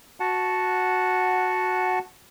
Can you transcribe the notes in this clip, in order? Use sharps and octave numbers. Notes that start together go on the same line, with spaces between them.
F#4 F#5 A5